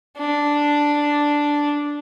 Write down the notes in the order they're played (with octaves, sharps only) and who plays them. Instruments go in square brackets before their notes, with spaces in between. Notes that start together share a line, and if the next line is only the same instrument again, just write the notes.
[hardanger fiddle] D4